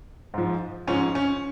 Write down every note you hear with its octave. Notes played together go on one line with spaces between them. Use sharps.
G#2 F3
G#2 F3 C#4
C#4